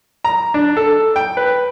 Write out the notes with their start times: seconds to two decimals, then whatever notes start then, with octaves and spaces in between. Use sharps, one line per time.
0.24 A#5
0.54 D4
0.77 A4
1.16 G5
1.37 B4